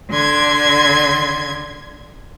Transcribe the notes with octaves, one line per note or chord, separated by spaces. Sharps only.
D3 C6 G#6